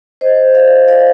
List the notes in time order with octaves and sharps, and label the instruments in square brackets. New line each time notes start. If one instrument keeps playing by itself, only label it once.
[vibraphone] C5 D#5
D5 F5
D5 F5